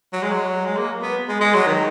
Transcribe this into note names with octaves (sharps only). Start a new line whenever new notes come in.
F#3
G#3
F#3
G#3
A#3
B3
G#3
G#3
F#3
D#3